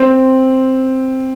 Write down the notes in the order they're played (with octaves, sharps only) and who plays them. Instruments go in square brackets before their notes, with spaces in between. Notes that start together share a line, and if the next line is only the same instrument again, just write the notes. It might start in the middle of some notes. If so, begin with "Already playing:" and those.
Already playing: [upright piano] C4